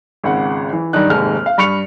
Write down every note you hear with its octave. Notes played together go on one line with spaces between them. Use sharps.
G#1 C#2 F#5
E3
G2 D#3 D4 D#4 F#6
F1 D#2 G#2 F6
F5
G2 B5 C#6 C#7 F7